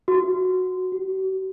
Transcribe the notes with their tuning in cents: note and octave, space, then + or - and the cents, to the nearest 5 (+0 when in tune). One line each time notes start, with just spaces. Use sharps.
F#4 -5
F#4 +45